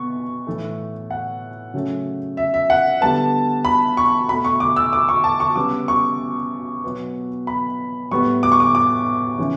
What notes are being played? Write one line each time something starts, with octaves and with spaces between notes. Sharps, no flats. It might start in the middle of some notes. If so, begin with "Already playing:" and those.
Already playing: B2 B3 C#6
A2 E3 A3
F#5
C#3 F#3 A3
E5
E5
F#5
D3 G3 B3 A5
B5
C#6
B2 A3 B5
C#6
D6
E6
D6
C#6
A5
C#6
C#3 G3 B3 D6
C#6
B2 F#3 B3
B5
A2 G3 B3 C#6
D6
C#6
D6
D6
C#3 E3